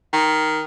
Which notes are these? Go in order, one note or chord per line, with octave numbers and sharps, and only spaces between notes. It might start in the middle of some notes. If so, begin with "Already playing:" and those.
D#3